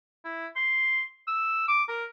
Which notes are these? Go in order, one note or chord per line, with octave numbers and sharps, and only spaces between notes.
E4
C6
E6
D6
A#4